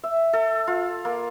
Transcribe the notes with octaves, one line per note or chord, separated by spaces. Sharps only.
E5
A4
F4
A#3